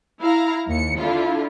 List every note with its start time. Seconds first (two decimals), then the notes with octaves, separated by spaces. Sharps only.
0.21 E4 F5 A#5
0.67 D#2 C#7
0.97 D3 E4 F4